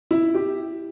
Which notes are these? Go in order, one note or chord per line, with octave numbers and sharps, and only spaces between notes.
E4
G4